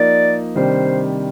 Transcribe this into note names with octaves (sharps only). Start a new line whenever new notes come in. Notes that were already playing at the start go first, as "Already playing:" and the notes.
Already playing: F3 A#3 D#4 D5
C3 D#3 G3 D4 C5